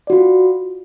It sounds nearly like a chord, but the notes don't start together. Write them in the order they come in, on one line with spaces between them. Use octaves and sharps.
D5 F#4 F4